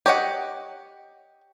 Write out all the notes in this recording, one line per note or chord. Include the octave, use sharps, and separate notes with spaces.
G4 C#5 D#5 F#5